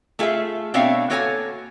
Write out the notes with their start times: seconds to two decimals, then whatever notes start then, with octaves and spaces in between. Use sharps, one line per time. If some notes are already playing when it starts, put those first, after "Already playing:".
0.19 A3 F4 G#4 A#4 E5
0.74 B2 C4 D4 C#5 E5 F5
1.10 A#3 F#4 A4 C#5 E5 G#5